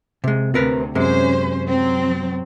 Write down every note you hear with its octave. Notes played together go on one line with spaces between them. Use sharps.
C3 G#3
D2 C3 C4 A#4 B4
F#2 C3 G#3 C#4 C5
F#3 C4